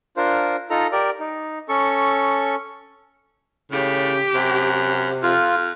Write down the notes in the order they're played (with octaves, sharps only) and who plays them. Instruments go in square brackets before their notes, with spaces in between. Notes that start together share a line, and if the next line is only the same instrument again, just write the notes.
[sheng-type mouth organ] D4 F4 A#4 C5
D#4 F4 A4 A#5
G4 A#4 D5
D#4
C#4 A4 C#6
[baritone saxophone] A2 [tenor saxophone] C#3 [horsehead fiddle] G4
[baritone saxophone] F#2 [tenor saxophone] C3
[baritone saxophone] F2 [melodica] F4